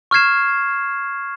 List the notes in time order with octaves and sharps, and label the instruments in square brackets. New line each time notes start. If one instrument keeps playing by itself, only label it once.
[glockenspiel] C#6 F6 G#6 C7 E7